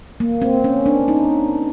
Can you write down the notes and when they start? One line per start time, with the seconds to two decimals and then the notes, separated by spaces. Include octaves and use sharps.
0.20 A#3
0.42 C4
0.64 C#4
0.86 D4
1.08 D#4